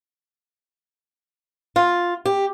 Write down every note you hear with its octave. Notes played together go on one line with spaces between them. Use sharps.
F4
G4